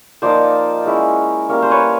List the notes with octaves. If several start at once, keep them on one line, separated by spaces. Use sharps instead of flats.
F3 A#3 D#4 C5 D5
G#3 C#4 E4
G3 A#3 C#4
C5
B4 C#5